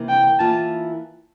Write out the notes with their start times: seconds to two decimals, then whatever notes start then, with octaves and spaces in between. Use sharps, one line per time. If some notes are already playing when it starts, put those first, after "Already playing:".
Already playing: C3 E3 A#3
0.09 G5
0.39 E3 A#3 F4 A5